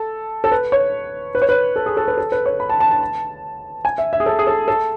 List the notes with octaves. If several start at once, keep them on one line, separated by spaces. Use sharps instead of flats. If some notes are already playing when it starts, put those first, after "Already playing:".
Already playing: A4
A4
B4
C#5
B4
C#5
B4
A4
G#4
A4
B4
A4
B4
C#5
B5
A5
A5
A5
G#5
E5
E5
G#4
A4
G#4
A4
A4